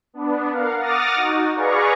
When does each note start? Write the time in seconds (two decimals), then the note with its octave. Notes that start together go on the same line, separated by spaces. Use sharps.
0.14 B3 D4
0.51 A#4 F5 F#5
0.80 F#5 D6 D#6 F6 A6 A#6
1.15 D#4 F#4
1.55 G#4 B4 D5 F5 A#5 C#6